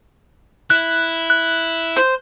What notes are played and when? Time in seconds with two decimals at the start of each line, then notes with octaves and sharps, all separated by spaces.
0.70 E4 F#6
1.30 F#6
1.96 C5